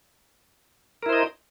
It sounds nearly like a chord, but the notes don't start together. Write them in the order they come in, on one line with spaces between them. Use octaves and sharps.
A#4 E4 C5 D#5